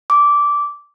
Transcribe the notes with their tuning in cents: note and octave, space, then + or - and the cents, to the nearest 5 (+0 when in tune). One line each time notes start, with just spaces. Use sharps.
D6 -10